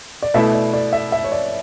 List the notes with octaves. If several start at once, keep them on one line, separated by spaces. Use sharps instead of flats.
D5
B2 A3 E4 E5
D5
D5
E5
E5
C#5
D5